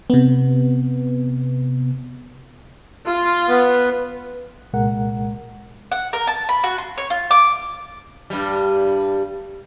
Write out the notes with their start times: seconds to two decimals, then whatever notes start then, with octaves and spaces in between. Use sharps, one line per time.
0.10 C3 B3
3.07 F4
3.49 B3
4.73 C2 A#2 G#3 A#4 F#5
5.92 F#5
6.13 A#4
6.27 A5
6.49 B5
6.64 F#4
6.78 C6
6.98 C#5
7.10 F4
7.31 D6
8.30 G2 G3